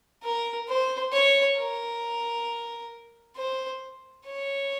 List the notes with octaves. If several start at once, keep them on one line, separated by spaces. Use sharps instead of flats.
A#4
C5
C#5
A#4
C5
C#5